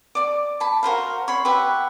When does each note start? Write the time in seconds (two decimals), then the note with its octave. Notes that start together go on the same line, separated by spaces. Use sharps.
0.15 D5 D6
0.60 A5 B5
0.83 F#4 A#4 C5 F5
1.28 C#5 B5 C6
1.45 G4 B4 E5 F#5